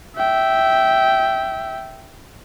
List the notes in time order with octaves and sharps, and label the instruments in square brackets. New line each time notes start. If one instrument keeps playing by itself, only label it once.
[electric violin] E5 G5